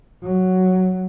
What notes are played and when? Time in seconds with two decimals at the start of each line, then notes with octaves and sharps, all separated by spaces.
0.23 F#3